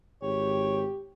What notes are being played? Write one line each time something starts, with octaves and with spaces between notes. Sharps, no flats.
G#1 G4 C#5